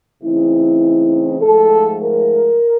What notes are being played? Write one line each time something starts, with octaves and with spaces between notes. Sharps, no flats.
C#3 E3 A3 C4 D#4 E4
G#2 F3 A3 A4
A#4